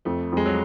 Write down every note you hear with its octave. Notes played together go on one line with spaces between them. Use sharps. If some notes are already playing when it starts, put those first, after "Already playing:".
F2 A3
F2 G#3
F#3